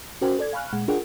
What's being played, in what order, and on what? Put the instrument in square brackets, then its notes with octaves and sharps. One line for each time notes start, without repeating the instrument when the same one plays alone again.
[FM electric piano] C#4 F#4 A#4 C5 G5 G#5
A4 D5 G#6
F5 G#5 B5 C#6 F6 F#6
A#2 G#3 F#5
D4 F4 G#4 A#4 F#5 G5